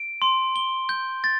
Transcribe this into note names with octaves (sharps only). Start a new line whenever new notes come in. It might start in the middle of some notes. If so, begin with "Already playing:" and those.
Already playing: D7
C6
G7
G6
A6